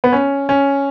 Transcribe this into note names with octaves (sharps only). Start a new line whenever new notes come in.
B3
C#4
C#4